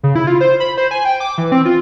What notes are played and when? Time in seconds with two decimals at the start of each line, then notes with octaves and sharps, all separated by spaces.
0.03 C#3
0.15 E4
0.27 F4
0.41 C5
0.60 B5
0.78 C5
0.91 G#5
1.05 G5
1.20 D6
1.38 E3
1.52 C4
1.65 F4